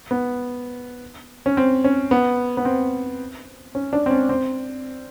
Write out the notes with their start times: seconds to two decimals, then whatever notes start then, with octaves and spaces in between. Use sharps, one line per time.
0.11 B3
1.46 C#4
1.57 C4
1.84 C#4
2.11 B3
2.57 B3
2.65 C4
3.75 C#4
3.93 D4
4.06 C4
4.10 C#4
4.29 C4